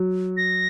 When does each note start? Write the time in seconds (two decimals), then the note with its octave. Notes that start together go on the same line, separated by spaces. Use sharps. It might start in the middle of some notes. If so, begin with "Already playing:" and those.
Already playing: F#3
0.37 A#6